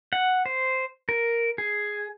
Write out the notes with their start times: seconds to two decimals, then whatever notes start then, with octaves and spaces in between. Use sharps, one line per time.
0.13 F#5
0.46 C5
1.09 A#4
1.58 G#4